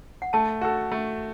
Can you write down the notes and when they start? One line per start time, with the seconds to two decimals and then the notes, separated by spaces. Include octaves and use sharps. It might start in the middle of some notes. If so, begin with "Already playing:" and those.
0.22 F#5
0.33 A3 A5
0.61 F#4 A4
0.92 A3